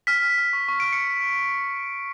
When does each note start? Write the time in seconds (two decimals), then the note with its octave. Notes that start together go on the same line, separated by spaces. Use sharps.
0.07 F6 B6
0.22 F6
0.38 F6
0.53 C#6
0.68 C#6
0.80 F6 D7
0.93 C#7